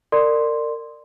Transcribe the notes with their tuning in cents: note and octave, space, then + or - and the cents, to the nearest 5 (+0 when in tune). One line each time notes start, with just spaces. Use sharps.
A#4 -30 D5 +20 C6 +0